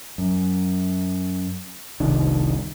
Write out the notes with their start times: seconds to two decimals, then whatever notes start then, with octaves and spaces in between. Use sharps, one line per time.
0.18 F#2
2.00 F1 C2 D#3 D4